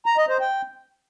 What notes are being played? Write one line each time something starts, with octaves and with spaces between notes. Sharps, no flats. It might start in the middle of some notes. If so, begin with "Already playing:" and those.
A#5
D#5
C5
G5